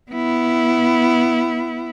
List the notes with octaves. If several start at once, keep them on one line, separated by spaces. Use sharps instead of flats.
B3 E4